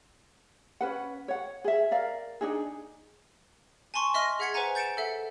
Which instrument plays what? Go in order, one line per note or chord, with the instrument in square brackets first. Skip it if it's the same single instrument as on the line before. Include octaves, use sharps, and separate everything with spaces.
[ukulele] C#4 B4 F#5
C#5 F#5
G#4 E5
A#4 D5 F5
D4 D#4 G#4
[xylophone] G#5 A5 C6 C#6
D#5 E5 C6 F6 A#6
G#4 E5 F#5 G#6 B6 C#7
B4 C5 E5 F#5 G#5 A#5
G6 A6 C#7 D7 E7
A4 E5 F#5